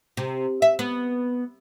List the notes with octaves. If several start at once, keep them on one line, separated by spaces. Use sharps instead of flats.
C3
E5
B3